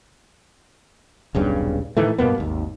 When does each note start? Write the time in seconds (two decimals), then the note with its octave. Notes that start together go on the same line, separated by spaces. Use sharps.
1.35 D#1 B1 G2 C#3
1.97 A2 D#3 E3 A3
2.18 G2 B2 A#3 B3
2.38 G#1 D#2